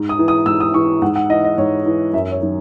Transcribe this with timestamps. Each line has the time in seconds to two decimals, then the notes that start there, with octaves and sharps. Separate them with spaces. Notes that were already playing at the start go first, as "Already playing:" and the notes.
Already playing: G#2
0.09 D#6
0.19 E3
0.28 D#6
0.46 G#2 E6
0.60 D#6
0.74 E3 C#6
1.02 G#2 F#5
1.16 F#5
1.30 E3 D#5
1.44 D#5
1.58 G#2 C#5
1.86 E3
2.13 F#2 E5
2.31 C#5
2.41 D#3 F#3